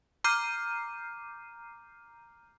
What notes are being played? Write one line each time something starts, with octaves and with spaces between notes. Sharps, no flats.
A#5 D6 F6 G6 C7 D#7